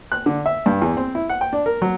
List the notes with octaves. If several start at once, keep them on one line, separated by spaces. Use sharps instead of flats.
F#6
D3
E5
G2
E2
C4
E4
F#5
G5
D4
A#4
F#3